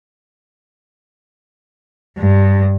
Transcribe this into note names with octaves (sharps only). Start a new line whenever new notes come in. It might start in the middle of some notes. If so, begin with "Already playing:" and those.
G2